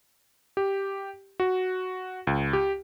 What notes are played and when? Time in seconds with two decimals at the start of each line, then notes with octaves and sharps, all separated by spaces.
0.57 G4
1.40 F#4
2.27 C#2
2.53 G4